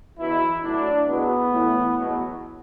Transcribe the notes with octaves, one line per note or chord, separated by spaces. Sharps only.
E2 B2 F#3 E4
A2 F#3 D4
E2 B2 F#3 B3
A2 E3
E2 B2 F#3